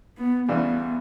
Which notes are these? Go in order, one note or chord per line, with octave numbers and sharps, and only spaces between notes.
B3
D2 C#3 E3 G3 B3